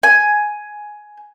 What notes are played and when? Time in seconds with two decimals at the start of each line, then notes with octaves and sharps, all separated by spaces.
0.03 G#5